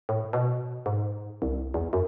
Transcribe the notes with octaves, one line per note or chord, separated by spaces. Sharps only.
A2
B2
G#2
C2
E2
F#2